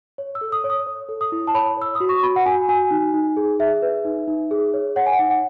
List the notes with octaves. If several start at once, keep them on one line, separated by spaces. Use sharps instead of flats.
C#5
E6
A4
D#6
C#5
D#6
C#5
A4
D#6
E4
A5
C#5 B5
C#5 E6
D#6
F#4
C#6
F#4 B5
F#5
F#4 G#5
F#4 G#5
D#4
D#4
G#4
G#4 E5
B4
D#4
D#4
G#4
C#5
C#5 F#5
G#5
F#5
D#4
F#5